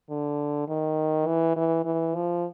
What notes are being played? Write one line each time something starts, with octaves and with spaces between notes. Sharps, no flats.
D3
D#3
E3
E3
E3
F3